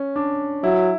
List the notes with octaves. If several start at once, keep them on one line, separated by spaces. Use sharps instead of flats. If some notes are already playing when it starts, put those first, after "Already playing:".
Already playing: C#4
D4
F#3 E4